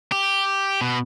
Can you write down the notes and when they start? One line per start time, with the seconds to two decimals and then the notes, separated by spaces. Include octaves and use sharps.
0.12 G4
0.81 B2